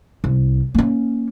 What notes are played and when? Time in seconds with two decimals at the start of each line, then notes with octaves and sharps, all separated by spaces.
0.24 C2
0.75 A#3 C#4